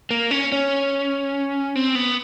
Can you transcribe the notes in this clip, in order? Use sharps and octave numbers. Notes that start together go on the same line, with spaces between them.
A#3
C#4
C#4
C4
B3